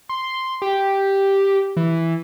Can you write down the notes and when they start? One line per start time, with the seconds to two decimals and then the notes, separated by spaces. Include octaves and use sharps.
0.09 C6
0.62 G4
1.77 E3